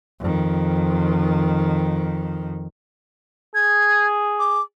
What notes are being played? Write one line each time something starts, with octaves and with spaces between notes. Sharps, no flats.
F2 D#3
G#4 G#6
D6